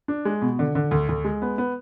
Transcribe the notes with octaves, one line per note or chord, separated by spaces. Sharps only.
D4
G#3
B2
D3
D3
D2
D2
G#3
B3
B3